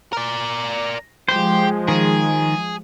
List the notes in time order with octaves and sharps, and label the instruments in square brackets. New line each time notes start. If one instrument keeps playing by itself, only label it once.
[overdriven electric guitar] A#4 D5
[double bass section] F3 G#3 [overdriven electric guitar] G4 [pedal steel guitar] C5
[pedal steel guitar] D#3 [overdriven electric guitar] G#4